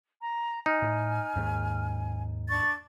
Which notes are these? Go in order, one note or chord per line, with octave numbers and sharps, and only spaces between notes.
A#5
D#4 G#5 F6
A2
D#2 G#2
D4 D5 C#6 A6